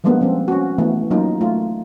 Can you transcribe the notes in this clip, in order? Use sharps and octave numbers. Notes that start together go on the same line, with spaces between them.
F3 G3 G#3 A#3 B3 D4
F3 C4 C#4
C#4 F#4
E3 A3 B3
F#3 A#3 C#4 D#4 F4
A3 F4